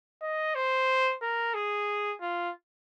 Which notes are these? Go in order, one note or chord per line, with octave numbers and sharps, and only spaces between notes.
D#5
C5
A#4
G#4
F4